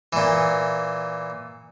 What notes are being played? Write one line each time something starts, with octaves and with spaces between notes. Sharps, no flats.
A#2 E3